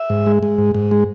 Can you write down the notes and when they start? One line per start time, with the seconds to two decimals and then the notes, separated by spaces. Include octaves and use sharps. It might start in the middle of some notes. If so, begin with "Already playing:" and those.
Already playing: E5
0.10 G#2
0.26 G#3
0.43 G#3
0.58 G#2
0.74 G#2
0.91 G#3